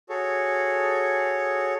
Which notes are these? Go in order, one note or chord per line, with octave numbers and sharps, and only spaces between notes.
F#4 G#4 A4 C#5